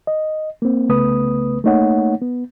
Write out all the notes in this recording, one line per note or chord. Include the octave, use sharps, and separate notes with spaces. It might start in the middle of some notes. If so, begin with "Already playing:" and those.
D#5
A#3 C4
C2 C#3 A3 B3 B4 D#6
A3 A#3 D#4 C#5 F#5
B3